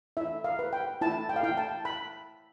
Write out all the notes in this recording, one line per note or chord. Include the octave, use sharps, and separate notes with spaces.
E4 E5
F5
B4
G5
E4 A5
G5
F5
E4 G5
A5
B5